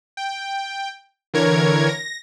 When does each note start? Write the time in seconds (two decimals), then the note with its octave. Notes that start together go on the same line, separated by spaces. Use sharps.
0.17 G5
1.34 D3 E3 A#4 C#5 G#6
1.89 A#6